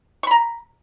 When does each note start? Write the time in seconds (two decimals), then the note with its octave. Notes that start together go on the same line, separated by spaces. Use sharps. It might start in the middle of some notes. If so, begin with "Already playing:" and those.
0.23 C#6
0.27 B5
0.31 A#5